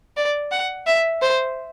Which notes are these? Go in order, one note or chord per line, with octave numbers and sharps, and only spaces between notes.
D5
F#5
E5
C5